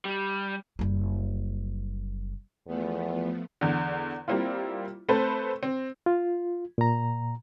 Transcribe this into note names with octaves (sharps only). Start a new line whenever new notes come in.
G3
F#1 G3
E2 F3 A3 B3
E2 D3
G3 A#3 C4 E4 F4
A3 C4 A4 B4 C5
C4
F4
A#2 A#5